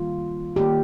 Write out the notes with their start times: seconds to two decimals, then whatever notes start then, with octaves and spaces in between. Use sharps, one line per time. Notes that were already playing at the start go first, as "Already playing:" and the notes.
Already playing: D#3 G3 A#3 F4
0.56 D#3 A#3 G4